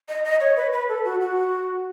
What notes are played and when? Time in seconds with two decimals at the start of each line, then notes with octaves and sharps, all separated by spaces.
0.09 D#5
0.25 D#5
0.41 C#5
0.56 B4
0.73 B4
0.89 A4
1.05 F#4
1.21 F#4